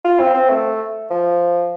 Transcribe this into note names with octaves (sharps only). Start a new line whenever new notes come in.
F4
C4
C4
A3
F3